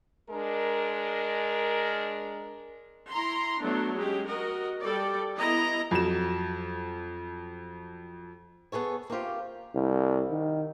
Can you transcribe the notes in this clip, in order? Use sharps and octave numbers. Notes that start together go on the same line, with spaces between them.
G#3 D4 A#4
E4 A#5 C6
F#3 A3 B3 D4
G#3 C#4 G4
F#4 A#4 D#5
G3 A4 D5
B3 E4 D#5 A#5
F2 F#3 E7
B3 G#4 A4 C#5
A#3 C4 F4 G4
C2
D#3